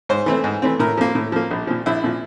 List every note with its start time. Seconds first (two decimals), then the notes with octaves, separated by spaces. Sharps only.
0.09 G#2 C5
0.26 E3 A3 C4
0.44 G#2
0.62 E3 A3 C4
0.80 A2 A#4
0.97 F3 A#3
1.15 A2
1.32 F3 A#3
1.51 A#1
1.67 A#2 F3
1.86 A#1 E4
2.04 A#2 F3